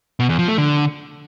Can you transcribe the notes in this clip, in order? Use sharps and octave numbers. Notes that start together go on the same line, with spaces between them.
B2
E2
F3
A3
D3